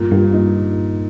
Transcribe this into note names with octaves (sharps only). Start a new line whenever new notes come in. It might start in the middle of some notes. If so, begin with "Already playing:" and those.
Already playing: G2 A#2
G2 A#2
D#4